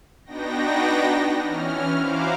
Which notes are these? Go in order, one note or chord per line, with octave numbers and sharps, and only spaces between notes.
B3 D4 D#4 F#4 G5 A#6
E3 C#4 F6
E4 F#4 C5 F5 A#5 D6